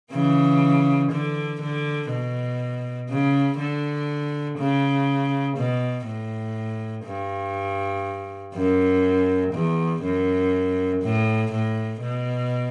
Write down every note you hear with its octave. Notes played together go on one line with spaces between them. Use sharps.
C#3 E3
D3
D3
B2
C#3
D3
C#3
B2
A2
G2
F#2
E2
F#2
A2
A2
B2